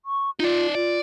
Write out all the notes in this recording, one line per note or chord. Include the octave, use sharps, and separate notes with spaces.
C#6
D#4 F4 D5
F4 D5